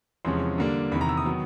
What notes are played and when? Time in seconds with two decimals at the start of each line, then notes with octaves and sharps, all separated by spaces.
0.25 E2 C3 F3 G#3 C#4 C6
0.58 D3 G3 A#3 D4
0.92 E2 C3 D#3 B5
1.01 A#5
1.09 E6
1.17 D#6
1.26 D#3 F#3 B3